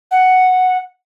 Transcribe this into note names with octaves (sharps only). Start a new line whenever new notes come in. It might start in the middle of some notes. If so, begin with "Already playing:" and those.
F#5